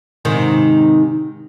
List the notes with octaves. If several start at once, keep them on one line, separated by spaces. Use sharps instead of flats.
G#2 C3 D#3